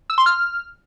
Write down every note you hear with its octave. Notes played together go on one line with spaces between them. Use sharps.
E6
C6
F6